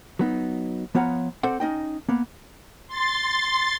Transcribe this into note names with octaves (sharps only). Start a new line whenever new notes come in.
F#3 B3 D#4
F3 B3 C#5 F5 F#5 A#5
C4 A4 C5 D5 F#5
C#4 D#4 D#5 G5
A#3 B3
C6 A6